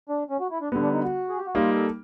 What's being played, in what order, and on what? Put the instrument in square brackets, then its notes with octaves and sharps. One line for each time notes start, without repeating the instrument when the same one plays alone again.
[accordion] D4
C#4
F#4
E4
D4
[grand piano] D3 G3 B3
[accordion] D4
D#4
F#4
G#4
G4
F#4
[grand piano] G3 A#3 D#4 [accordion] F4
[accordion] A4